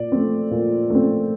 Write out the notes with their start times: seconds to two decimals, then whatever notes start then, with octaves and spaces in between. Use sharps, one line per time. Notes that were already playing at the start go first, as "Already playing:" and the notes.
Already playing: A#2 D5
0.12 A3 C4
0.51 A#2
0.90 A3 C4